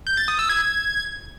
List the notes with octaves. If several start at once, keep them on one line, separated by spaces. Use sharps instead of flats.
G6
A6
D#6
E6
G#6